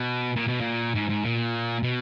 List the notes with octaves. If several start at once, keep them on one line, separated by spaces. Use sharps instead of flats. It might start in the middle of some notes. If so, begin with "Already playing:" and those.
Already playing: B2
A#2
B2
A#2
G#2
G#2
A#2
B2